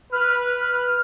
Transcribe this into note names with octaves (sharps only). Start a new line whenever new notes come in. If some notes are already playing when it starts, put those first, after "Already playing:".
B4 F6